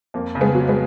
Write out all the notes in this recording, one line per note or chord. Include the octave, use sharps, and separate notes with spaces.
F2 A#3
C#3
G#3 B3
F#3
G#3 B3